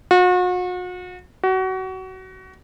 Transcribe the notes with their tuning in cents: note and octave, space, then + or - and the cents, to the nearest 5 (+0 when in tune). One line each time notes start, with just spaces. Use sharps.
F#4 -40
F#4 +25